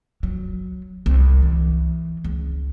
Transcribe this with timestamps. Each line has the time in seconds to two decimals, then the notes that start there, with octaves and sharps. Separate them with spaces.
0.23 F#3
1.06 C2
1.42 E3
2.24 C#2